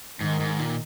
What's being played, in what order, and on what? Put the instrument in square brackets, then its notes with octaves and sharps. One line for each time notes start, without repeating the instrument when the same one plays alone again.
[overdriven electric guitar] G#2 [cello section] D#3
[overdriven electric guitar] G#2
A#2